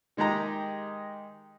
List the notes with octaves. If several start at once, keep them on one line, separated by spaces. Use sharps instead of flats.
D#3 G#3 D#4 G4 A#5